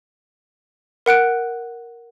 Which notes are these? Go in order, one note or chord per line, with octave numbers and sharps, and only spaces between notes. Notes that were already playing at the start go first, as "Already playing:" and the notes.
A#4 F#5 F#6 D7